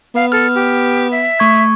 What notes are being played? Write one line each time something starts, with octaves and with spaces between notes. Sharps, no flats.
B3 F5
A4 F6
G4
E5
A3 C#6 G#6